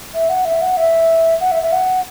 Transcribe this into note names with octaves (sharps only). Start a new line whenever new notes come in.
E5
F#5
E5
F#5
E5
F#5
E5
E5
F#5